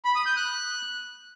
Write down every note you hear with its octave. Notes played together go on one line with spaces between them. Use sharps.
B5
D#6
G6
F#6